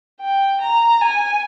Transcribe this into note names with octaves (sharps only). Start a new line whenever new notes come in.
G5
A#5
G#5